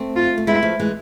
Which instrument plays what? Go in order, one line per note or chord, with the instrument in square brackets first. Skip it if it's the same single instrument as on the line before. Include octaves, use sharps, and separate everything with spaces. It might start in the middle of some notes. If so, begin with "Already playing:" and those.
Already playing: [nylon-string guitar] A3 C4
[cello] F4
[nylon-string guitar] A3
[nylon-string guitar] G#3 B3 [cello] E4
[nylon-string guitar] F3 A3
E3 G#3